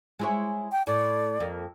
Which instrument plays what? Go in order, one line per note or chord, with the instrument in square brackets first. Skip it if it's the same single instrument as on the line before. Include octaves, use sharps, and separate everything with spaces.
[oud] G#3 E4 C#5
[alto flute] G5
[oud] A2 [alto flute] D5
[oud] F2 A#3